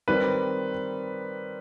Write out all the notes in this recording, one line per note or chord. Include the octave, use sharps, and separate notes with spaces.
D#3 G3 C4 B4